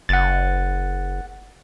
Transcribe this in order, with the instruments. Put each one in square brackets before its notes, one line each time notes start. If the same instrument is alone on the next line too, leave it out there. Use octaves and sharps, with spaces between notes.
[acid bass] F#1 [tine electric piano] F#5 A6